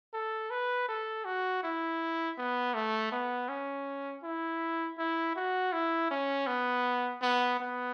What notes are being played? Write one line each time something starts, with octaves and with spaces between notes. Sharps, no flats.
A4
B4
A4
F#4
E4
B3
A3
B3
C#4
E4
E4
F#4
E4
C#4
B3
B3
B3